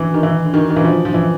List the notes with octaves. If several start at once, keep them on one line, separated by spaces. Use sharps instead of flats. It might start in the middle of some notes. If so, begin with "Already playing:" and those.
Already playing: E3
D#3
E3
D3
D#3
D3
D#3
E3
F3
F3
E3